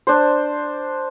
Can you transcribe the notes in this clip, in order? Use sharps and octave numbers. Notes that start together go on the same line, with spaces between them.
D4 C5